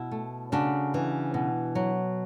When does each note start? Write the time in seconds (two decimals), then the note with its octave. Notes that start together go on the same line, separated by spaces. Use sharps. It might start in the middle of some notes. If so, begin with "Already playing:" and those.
Already playing: B2 E4
0.11 A3
0.52 C#3 D4 F#4
0.94 E3
1.34 B2
1.75 F#3